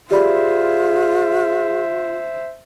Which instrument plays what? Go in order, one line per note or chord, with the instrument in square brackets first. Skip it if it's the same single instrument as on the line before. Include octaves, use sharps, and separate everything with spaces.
[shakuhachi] F4 [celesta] G4 D5 B5 [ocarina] G#4 [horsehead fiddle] C5 E5